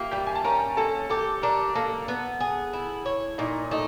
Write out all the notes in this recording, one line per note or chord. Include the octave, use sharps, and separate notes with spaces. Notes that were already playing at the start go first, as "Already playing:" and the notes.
Already playing: A#3 F4 G4 E5 G5
G3 G4 G5
G#5
A5
C#4 A#4 A#5
A#3 A4 A5
G4 A4 A5
D4 A#4 A#5
A#3 A4 A5
B3
G#4
E4
C#5
A#2 D#4 D#5
A3 D#4 D#5